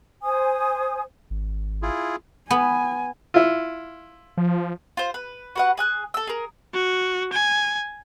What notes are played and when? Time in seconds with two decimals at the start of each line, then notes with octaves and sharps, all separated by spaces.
0.22 C5 G#5 D#6
1.30 G#1
1.82 E4 F4 G#4
2.51 B3 G#5
3.34 E4 F4
4.37 F3
4.97 F4 C5
5.14 B4
5.55 F#4 B4 F#5
5.77 G#4 G#5 F#6
6.14 A4 E6
6.27 G#4 A#4
6.74 F#4
7.33 G#5